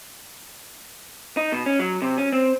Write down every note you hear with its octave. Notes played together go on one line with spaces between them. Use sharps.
D#4
B2
C#4
F#3
C3
C#4
C4